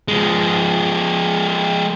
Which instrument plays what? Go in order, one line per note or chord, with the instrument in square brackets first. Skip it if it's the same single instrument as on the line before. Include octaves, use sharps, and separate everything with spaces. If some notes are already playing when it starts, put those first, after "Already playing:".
[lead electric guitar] F3 G#3